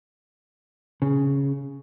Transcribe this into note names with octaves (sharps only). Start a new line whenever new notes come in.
C#3